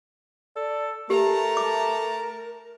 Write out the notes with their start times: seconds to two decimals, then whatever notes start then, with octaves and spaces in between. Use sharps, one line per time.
0.56 A4 D5
1.10 A3 G4 A#4 A5 A#5
1.57 D6